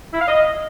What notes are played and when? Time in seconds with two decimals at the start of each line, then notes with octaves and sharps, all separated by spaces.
0.13 E4
0.20 F5
0.27 D#5